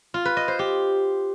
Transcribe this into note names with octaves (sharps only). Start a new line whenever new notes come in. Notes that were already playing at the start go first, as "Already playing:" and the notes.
F4
B4
D#5
C5
G4